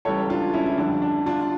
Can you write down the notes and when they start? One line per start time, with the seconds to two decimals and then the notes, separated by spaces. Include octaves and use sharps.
0.05 C#2 C#3 E3 G3 A4 C#5
0.30 D4 F4
0.54 C#4 E4
0.66 E4
0.78 F2 D3 G3 D4
1.02 D4
1.26 D4 F4
1.40 F4